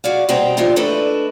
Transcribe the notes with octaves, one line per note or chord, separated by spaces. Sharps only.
F#4 G#4 D5 F5
B2 G3 C4 G#4 G5 A#5
E3 D4 D#4 F4 G4 C5
A3 D4 E4 A4 B4 D#5